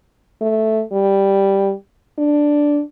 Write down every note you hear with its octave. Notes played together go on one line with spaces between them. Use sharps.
A3
G3
D4